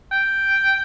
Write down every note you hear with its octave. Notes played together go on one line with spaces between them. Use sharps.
G5